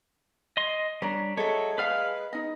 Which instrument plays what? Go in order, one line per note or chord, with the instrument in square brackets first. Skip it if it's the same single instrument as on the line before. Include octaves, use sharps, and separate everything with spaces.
[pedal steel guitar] D#5 C6
[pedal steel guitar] G3 D4 [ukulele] C#5 A#5
[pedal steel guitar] F#3 C#5 [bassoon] G#3 [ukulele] A4 E5
[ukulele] G#4 D5 F5 [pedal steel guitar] B4 F6
[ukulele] D#4 D#5